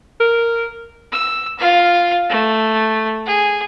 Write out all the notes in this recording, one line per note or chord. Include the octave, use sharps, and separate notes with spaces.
A#4
E6
F4 F5
A3
G#4